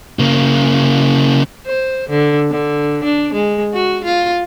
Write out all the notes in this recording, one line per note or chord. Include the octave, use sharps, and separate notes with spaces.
C#3 A#3
C5
D3
D3
D4
G#3
F#4
F4